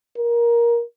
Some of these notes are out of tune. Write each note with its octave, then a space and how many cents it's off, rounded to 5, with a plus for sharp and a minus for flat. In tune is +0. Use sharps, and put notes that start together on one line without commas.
A#4 +15